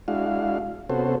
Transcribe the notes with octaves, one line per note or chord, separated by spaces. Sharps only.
G#3 D4 E4 F#4 F5
C3 B3 C#4 F#4 A4 C5